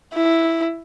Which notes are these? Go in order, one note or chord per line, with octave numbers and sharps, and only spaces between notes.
E4